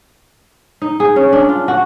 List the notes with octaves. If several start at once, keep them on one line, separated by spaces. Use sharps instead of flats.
D#4
G#4
C#4
D4
F4
F#4